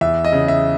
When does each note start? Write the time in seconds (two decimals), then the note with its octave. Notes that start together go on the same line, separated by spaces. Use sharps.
0.01 E2 E5
0.25 D#5
0.32 C#3
0.48 E5